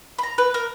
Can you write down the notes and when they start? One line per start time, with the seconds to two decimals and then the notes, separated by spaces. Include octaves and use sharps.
0.19 B5
0.23 A#5
0.38 B4
0.54 A#4